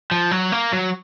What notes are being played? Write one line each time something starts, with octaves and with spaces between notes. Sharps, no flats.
F3
F#3
A#3
F#3